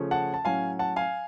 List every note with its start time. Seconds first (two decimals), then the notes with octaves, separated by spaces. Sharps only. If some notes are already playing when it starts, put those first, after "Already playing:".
Already playing: C#3 F3 A3 C#4
0.11 F#5 A5
0.34 A5
0.45 A2 F#3 C#4 F5 G#5
0.79 F#5 A5
0.96 F5 G#5